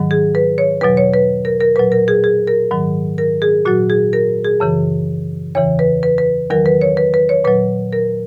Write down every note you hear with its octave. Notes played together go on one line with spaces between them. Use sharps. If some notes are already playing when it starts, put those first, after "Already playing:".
Already playing: G#2 D#3 F#3
G#4
B4
C#5
E2 B2 F#3 B4
C#5
B4
A#4
A#4
A#2 F#3 B4
A#4
G#4
G#4
A#4
G#2 D#3 F#3
A#4
G#4
A#2 F#3 F#4
G#4
A#4
G#4
F#2 C#3 E3
E2 C#3 E3 C#5
B4
B4
B4
E2 D#3 F#3 A#4
B4
C#5
B4
B4
C#5
A#2 F#3 B4
A#4